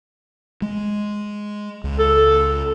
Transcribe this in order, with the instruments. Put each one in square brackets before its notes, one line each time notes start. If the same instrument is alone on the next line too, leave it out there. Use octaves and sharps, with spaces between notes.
[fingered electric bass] G#3
C#2
[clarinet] A4